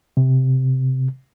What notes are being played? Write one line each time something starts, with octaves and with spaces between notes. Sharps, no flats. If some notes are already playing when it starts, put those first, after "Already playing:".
C3